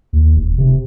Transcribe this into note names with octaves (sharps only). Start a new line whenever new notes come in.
D#2
E1
C3